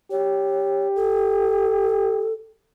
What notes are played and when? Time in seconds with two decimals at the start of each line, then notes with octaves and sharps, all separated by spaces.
0.11 G4 C#5
0.96 A4